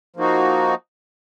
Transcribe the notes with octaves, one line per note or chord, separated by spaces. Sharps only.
F3 A#3 D#4 F#4